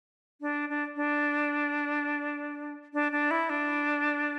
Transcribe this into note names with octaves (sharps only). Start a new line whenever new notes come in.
D4
D4
D4
D4
D4
E4
D4